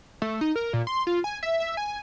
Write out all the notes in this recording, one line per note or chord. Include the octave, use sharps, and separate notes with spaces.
A3
D#4
A#4
A#2
C6
F4
G#5
E5
E5
G#5